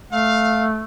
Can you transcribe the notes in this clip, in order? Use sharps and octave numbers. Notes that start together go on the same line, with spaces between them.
A3 F5